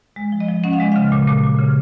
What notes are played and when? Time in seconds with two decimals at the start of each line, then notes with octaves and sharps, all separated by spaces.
0.16 G#3
0.32 F3
0.40 D#5
0.48 F3
0.64 C#4 F#5
0.73 F5
0.80 G#3 D#5
0.92 C#3 F5
1.12 A#2
1.27 A#2
1.43 A#2
1.59 C#3